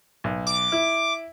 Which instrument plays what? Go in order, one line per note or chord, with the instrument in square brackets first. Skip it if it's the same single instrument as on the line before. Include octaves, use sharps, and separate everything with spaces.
[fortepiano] B1
[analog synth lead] D6
[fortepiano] E4